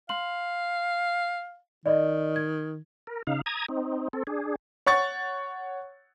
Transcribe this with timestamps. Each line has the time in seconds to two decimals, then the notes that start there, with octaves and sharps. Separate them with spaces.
0.09 F5 C6 F#7
1.86 D#3 D5 D#5
2.36 G#6
3.07 A#4
3.27 C#3 D#4 F5
3.46 A#5 D#6 G#6
3.69 C4 D#4
4.13 C4 A4
4.27 D4 G#4
4.86 C#5 F#5 C#6 A6